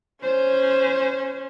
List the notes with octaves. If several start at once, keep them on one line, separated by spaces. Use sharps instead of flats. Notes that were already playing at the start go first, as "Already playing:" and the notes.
C#4 C5